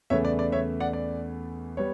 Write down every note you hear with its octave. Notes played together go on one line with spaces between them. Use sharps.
E2 C#3 E3 A3 C#5 E5
D5
D5
C#5 E5
D5 F#5
D5
G3 B3 C#5